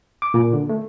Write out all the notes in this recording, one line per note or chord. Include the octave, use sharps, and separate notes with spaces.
D6
A#2
D3
A3